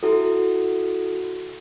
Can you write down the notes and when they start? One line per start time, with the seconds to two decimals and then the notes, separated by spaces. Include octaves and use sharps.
0.03 E4 F#4 A4